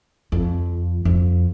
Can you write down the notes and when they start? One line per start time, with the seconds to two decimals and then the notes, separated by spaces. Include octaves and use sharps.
0.32 F2
1.05 F2